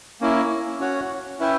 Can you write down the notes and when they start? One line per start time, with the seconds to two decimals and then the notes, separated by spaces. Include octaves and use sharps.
0.21 A#3 C#4 E4
0.80 C#4 F#4 C#5 F#5
1.39 C#4 E4 B4 E5 G5